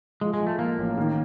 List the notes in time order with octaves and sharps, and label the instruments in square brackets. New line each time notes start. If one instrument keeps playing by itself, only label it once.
[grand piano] F3 [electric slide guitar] G#3
[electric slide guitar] G#3
[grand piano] F3
[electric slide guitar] A3
[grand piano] F3 [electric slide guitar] A#3
[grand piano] A1
D#3